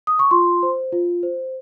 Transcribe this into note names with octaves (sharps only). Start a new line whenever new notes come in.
D#6
C#6
F4 C6
C5
F4
C5